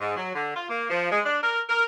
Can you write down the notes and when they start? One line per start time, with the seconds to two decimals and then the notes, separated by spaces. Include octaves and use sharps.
0.01 G#2
0.17 F#3
0.35 D3
0.56 F4
0.69 A#3
0.90 F3
1.11 G#3
1.25 D4
1.43 A#4
1.69 A#4